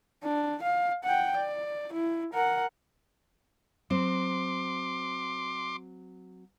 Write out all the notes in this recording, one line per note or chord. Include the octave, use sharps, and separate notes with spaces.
D4
F5
F#5 G5
D5
E4
A#4 F#5
F#3 C4 C5 C6 D6